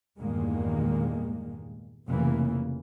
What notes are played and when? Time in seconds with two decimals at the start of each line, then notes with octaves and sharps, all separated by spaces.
0.17 E2 G2 A#2 D#3 G#3 A#3
2.08 F1 C#3 E3 A#3